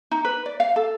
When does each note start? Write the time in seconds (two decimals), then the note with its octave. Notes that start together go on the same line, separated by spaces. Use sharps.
0.11 D#4
0.25 B4
0.46 D5
0.60 F5
0.76 A4